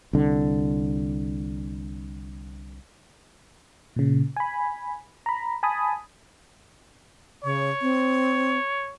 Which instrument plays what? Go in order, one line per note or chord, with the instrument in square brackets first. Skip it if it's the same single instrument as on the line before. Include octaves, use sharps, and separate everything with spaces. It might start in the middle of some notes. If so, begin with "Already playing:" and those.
[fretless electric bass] C2 D3
[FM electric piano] A#2 C#3
G#5 B5
A#5 B5
G#5 A5 B5 D#6
[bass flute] C#3 [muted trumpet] C#5
[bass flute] C4